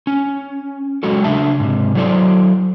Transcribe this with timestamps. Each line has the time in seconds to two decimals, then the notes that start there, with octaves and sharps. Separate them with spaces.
0.07 C#4
1.03 F#3 G#3 F#4 A4
1.24 C#3 D4 E5 A5
1.60 G#2 C3
1.95 F#3 E4 A4 C5 D5